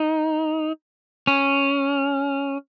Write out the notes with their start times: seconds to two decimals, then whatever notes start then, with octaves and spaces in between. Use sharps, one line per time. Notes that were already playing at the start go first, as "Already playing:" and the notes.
Already playing: D#4
1.27 C#4